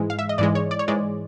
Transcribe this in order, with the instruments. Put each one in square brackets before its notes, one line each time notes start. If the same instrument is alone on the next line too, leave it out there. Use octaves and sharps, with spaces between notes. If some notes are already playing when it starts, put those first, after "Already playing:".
Already playing: [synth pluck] G#2 E3 G#3
F5
E5
D#5
G#2 E3 G#3 D5
C#5
D5
C#5
G#2 E3 G#3 D5